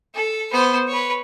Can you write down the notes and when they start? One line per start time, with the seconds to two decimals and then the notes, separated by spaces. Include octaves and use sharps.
0.15 A4
0.52 B3 C5
0.88 B4 C#5